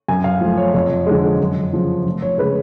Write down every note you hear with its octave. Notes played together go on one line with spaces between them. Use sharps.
F#2 G#5
F5
F3 A3
C#5
F2 C#5
D3 F3 G#3
F#2
C#3 F3
F1
C#5
C#3 G#3 B4